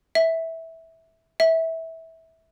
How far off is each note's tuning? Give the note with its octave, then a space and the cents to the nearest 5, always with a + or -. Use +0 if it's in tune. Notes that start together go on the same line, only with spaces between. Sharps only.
E5 -15
E5 -20